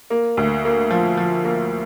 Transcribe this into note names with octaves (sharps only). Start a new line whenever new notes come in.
A#3
D2
A#3
F3
F3
A#3